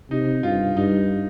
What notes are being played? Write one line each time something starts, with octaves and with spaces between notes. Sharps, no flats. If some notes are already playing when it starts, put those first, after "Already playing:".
C3 D#4
G2 F4
G2 D#4